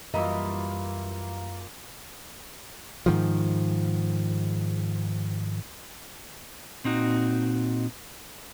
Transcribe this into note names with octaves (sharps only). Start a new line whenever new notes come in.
F#2 E3 G3 A#3 E4 F4 D#5
G#2 D#3 F3
A#2 C4 D#4 F#4